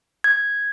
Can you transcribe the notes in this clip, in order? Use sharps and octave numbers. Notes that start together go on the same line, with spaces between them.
G#6